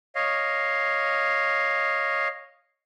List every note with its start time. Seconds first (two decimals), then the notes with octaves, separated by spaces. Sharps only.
0.15 C#5 D#5 F5